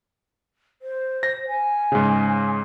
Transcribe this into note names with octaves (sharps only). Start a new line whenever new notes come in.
C5
A#6
G#5
G#2 C#3